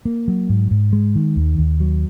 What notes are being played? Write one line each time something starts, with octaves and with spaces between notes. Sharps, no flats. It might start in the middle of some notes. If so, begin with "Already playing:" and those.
A#3
F#3
G#2
G#2
G#3
D#3
D#2
D#2
F#3